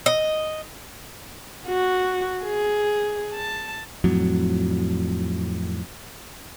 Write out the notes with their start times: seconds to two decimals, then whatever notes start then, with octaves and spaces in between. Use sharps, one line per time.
0.06 D#5
1.67 F#4
2.45 G#4
3.34 A5
4.04 F2 A2 F#3